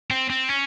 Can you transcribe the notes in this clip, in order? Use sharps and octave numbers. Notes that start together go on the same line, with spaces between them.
C4
C4
C#4